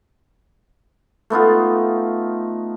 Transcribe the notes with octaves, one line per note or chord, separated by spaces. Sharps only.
A3 B3 D#4 F4